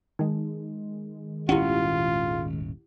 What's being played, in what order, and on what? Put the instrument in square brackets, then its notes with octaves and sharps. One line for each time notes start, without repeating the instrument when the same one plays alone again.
[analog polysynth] D#3 G#3 [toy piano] D#4
[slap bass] D#1 G#1 C#4 [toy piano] E4 G4 F#5 [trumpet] F4